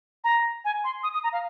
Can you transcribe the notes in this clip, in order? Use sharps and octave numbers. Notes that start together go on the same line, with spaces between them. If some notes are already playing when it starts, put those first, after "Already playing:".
A#5
G#5
C6
D#6
D#6
A#5
F5